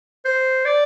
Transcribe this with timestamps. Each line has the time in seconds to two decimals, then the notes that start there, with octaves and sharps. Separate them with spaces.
0.25 C5
0.65 D5